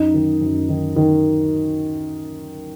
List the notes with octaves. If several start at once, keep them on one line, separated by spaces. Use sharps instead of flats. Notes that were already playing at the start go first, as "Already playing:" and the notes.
Already playing: F#2 D#4
D#3
F#2
D#3
D#3